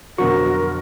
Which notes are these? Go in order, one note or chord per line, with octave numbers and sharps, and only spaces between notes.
F2 B2 D3 F#3 F#4 A#4 C#6